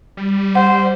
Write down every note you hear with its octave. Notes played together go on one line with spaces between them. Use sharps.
G3
C5 F#5